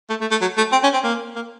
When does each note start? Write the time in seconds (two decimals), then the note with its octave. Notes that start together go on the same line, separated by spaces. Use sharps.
0.10 A3
0.21 A3
0.31 A3
0.41 F#3
0.57 A3
0.72 C4
0.83 C#4
0.93 C4
1.04 A#3
1.36 A#3